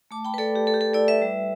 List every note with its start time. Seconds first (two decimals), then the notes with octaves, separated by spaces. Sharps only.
0.11 A3 A5 D6
0.25 G5 B5
0.34 B4
0.38 A3 A4 D5
0.55 G4
0.67 A3 A4
0.74 G4
0.81 A4
0.94 E4 A4 D5
1.08 B4 E5
1.22 G3